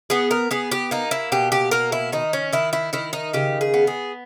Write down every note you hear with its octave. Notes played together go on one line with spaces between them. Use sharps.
B3 G#4
A#4
B3 G#4
G4
A#3 D#4
E4
B2 G4
G4
A#3 A#4
E4
D#3 D#4
C#4
D#3 E4
E4
D#3 E4
D#4
C#3 G4
G#4
B3
G#4